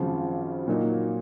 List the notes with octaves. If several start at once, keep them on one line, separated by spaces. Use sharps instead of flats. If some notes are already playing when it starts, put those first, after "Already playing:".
Already playing: G#1 F#2 C#3 F3
A#2 F#3 A#3 D#4 F#4